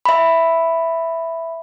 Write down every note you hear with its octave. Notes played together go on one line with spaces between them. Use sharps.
E5 B5